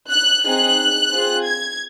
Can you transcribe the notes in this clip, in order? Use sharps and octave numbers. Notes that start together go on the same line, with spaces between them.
F#6
C4 D#4 G#4 F#6
C4 F4 G#4
G#6